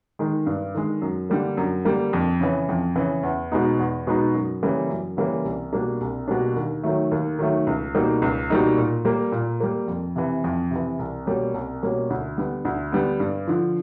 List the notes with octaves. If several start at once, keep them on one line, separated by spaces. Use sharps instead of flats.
D#3 G#3
G2
D#3 G#3
F#2
D3 G3 A#3
F#2
D3 G3 A#3
F2
C#3 E3
F2
C#3 E3
E2
B2 G#3 B3 D#4
E2
B2 G#3 B3 D#4
F#2
C#3 E3 G3 A#3
F#2
C#3 E3 G3 A#3
C2
B2 G3 A#3 D4
C2
B2 G3 A#3 D4
D#2
D#3 F#3 A3
D#2
D#3 F#3 A3
C#2
B2 G3 A#3 D#4
C#2
B2 G3 A#3 D#4
A#2
G3 A#3
A#2
G3 A#3
F2
C3 E3
F2
C3 E3
C2
B2 G3 A#3 C#4
C2
B2 G3 A#3 C#4
D2
D3 G3 B3
D2
D3 G3 B3
G2
D3 F3